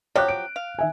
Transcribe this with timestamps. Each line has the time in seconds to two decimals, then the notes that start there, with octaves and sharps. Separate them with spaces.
0.15 F3 F#3 G4 C#5 F#6
0.28 D7
0.56 F5
0.79 D#3 E5 G#5